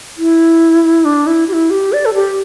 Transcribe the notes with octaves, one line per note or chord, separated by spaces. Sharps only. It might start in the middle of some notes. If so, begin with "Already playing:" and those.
E4
D4
E4
G4
E4
G4
D5
A4
G4